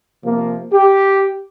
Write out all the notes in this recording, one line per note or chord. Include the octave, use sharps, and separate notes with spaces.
C3 F3 A#3
G4